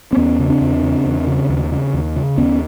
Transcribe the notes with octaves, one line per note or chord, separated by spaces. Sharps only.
C4
E2 B3 C#4
C#3
C4 D4
E2
C#3
E2
C#3
D#2
C#3
D#2
C#3
D#2 B3 C#4